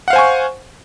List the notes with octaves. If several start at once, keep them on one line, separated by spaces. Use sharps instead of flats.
C5 F5 F#5 G#5 C#6